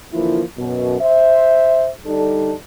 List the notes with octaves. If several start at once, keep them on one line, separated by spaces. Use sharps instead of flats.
D3 E3 F3 A#3 E4 F4
F#2 B2
C5 E5
D3 G3 D4 D#4 A4